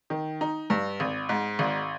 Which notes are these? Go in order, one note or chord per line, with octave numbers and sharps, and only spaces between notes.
D#3
D#4
G2
G#1
G#2
G#1